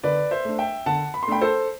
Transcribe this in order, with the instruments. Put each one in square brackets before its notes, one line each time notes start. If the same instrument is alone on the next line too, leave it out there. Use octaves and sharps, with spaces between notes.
[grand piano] D3 B4 D5
C5 E5
A3 D4
E5 G5
D3 F#5 A5
B5
C6
A3 D4 G5 B5
A4 C5